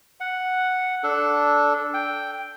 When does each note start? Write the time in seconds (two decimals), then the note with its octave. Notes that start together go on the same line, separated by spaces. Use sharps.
0.20 F#5
1.03 D4 A4
1.94 G5